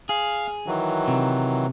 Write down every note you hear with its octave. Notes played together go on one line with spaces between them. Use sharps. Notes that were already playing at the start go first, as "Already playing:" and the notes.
G#4 F5 F6
D#3 E3 F#3
C3